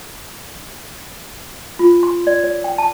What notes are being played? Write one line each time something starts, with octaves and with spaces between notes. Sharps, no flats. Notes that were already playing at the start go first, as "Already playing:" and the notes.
F4
C6
D5
C#5
G5
A5